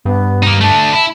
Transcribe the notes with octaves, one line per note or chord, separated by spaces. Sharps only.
G2 B3
A#3 D#4
A3 D4 A5
E4